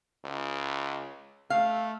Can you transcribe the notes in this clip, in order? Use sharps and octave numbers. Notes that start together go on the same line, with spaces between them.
C#2
A3 F5